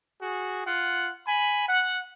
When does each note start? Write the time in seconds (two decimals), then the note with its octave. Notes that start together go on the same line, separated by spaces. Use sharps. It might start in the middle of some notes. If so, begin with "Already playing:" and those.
0.21 F#4 G#4
0.65 F4 F#5
1.27 G#5 B5
1.67 F#5